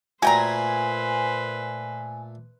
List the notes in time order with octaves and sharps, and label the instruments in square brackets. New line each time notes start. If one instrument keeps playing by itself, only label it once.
[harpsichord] A#2 A3 [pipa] F#4 G5 A#5 [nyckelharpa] B4 C5 [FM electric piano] G#5